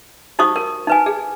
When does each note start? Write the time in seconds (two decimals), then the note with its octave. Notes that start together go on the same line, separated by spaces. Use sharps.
0.39 D#4 F#4 C5 C#6 D#6
0.56 A#4
0.87 D#4 B4 G#5
1.06 G#4